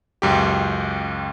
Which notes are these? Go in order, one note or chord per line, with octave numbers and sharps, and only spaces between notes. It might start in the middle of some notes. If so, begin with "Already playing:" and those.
C#2 F#2 G4